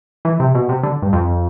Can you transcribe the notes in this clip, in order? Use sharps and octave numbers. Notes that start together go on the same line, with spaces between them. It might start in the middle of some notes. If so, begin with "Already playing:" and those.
E3
C3
B2
C3
D3
G2
F2